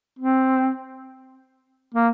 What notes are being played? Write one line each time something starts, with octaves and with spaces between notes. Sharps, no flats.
C4
A#3